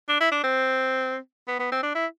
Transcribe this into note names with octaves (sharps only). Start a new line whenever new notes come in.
D4
E4
D4
C4
B3
B3
C4
D4
E4